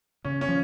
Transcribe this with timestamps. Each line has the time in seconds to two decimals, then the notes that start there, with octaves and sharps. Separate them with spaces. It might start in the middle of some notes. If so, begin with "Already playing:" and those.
0.25 C#3 C#4
0.41 C#4
0.49 F3